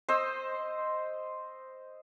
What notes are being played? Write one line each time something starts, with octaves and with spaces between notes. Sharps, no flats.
C5 D#5 E6